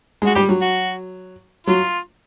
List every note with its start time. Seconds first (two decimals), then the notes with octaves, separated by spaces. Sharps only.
0.22 G#3
0.26 F#4
0.35 G3 G4
0.49 F#3
0.62 F#4
1.67 F#3 F4